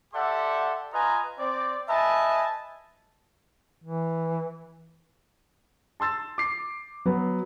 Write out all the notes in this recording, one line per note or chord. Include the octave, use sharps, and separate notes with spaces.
G4 A4 D5 E5 F#5 C6
F4 B4 D#5 G#5 A#5
C4 D5
B4 D#5 E5 G#5 A5
E3
A5 C6 E6 A6
D6 C7
F#3 B3